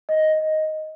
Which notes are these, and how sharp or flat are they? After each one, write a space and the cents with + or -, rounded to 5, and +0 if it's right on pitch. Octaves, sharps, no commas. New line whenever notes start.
D#5 +5